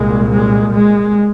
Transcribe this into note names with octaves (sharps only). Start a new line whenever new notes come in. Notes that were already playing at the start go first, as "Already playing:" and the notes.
Already playing: C2 A#2 G#3
G#3
G#3